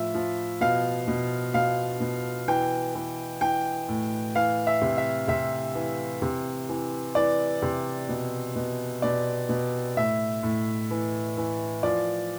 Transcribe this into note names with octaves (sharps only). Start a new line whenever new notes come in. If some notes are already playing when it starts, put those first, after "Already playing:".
Already playing: A2 F3 E5
F3
B2 F5
B2
B2 F5
B2
E3 G5
E3
E3 G5
A2
E3 F5
E5
C3
E5
C3 E5
E3
C3
E3
E3 D5
C3
B2
B2
B2 D5
B2
A2 E5
A2
E3
E3
F3 D5